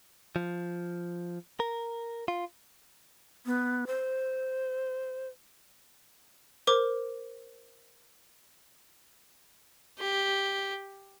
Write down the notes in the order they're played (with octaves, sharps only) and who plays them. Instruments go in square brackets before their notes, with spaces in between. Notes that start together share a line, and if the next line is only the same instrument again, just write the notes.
[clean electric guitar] F3
A#4
F4
[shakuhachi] B3
C5
[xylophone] A#4 C5 D6
[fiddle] G4